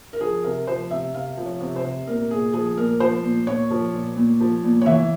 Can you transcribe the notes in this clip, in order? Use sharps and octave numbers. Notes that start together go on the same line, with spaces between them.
A#4
F3 G#4
C3 A#4
F3 C5
C3 E5
C3 F5
F3
C#5
C3
C5
C3
A#2 A#4
A#2 G#4
F3 G#4
A#2 A#4
F3 C5
A#2
A#2 C#5
F3
A#2
A#2
F3
A#2
C#5
E3 E5